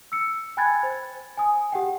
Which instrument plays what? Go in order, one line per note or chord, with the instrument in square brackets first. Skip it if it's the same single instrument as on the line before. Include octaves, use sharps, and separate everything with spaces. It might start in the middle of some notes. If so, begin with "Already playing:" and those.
[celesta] E6 C#7
G5 G#5 B5 F#6 G#6 A6
C5
G#5 D#6
G4 F#5 G5